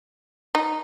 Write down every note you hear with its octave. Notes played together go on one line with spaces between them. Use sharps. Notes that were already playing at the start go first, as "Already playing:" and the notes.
D#4